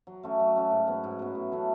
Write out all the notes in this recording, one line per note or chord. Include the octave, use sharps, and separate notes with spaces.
F#3
A3 C#4 F#4
F#3
A3 C#4 F#4
G#2
F#3 B3
G#2
F#3 B3
A2
F#3 A3 C#4